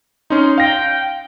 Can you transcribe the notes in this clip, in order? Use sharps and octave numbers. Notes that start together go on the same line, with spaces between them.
C#4 D#4 C6
F5 G5 A#6